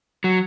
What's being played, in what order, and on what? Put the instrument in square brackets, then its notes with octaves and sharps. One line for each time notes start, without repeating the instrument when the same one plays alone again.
[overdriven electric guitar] F#3